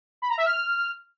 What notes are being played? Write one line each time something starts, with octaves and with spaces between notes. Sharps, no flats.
B5
A#5
E5
F6